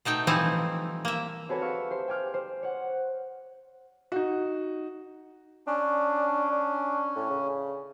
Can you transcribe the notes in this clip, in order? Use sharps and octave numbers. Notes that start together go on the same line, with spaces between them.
B2 A3 D#4 G5
E3 F3 G3 C4 D#4 E4
A#3 E5
C4 F#4 G#4 A4 B4 C#5
E5 F5 C#6 E6
G4 C5 C6
G5 G#5 D6 F6 G6
C5
C#5 F#5
D#4 F#4
C#4 D4
D4
A2
C#3